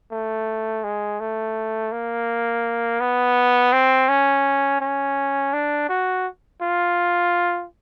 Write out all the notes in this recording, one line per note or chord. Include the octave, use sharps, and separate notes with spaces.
A3
G#3
A3
A#3
B3
C4
C#4
C#4
D4
F#4
F4